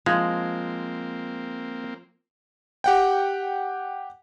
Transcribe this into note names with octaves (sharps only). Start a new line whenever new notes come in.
F3 G#3 A#3 C4
G4 F#5 G5